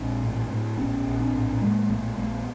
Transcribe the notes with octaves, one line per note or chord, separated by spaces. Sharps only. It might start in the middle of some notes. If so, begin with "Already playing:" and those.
Already playing: A#1 C4 D4
A2
A2
A#1 B3 C#4
A#1
C4 D4
A2
A2 G#3 A#3
A#1 A3 B3
A#1 A3 B3